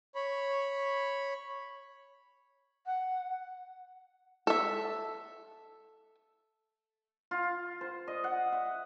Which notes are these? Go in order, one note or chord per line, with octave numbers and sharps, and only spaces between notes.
C#5 B5
F#5
A4 E5
F4
C5
D#5
F#5
E5